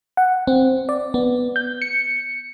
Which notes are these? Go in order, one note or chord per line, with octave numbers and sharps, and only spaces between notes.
F#5
C4
D5
B3
G6
C#7